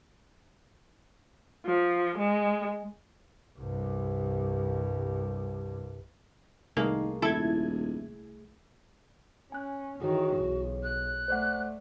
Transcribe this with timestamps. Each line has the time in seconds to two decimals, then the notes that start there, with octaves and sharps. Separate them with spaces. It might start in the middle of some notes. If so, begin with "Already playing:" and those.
1.66 F3
2.18 G#3
3.58 C2 G2
6.77 C2 D#3 A3 A#3 G#4
7.22 D#1 E4 A4 G#6
9.52 C#4 G#5 F#6
10.01 D#3 E3 F#4 G#4 C#5
10.38 B1
10.83 F#6
11.28 A3 C5 D5 F#5